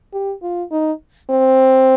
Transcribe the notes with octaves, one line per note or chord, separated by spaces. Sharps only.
G4
F4
D#4
C4